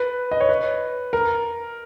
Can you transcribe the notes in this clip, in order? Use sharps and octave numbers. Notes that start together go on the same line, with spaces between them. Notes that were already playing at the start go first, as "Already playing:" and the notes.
Already playing: B4
D#5
C#5
B4
A#4